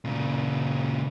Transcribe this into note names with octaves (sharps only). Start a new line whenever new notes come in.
A#2 C#3